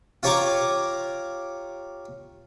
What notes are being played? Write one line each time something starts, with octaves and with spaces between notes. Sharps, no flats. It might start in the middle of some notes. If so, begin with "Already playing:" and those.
F4 G4 C#5 A#5 C#6 D6